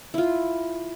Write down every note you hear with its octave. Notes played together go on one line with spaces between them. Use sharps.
E4 F4